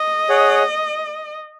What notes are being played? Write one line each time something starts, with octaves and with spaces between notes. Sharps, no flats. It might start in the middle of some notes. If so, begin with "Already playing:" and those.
Already playing: D#5
G#4 C#5 F#5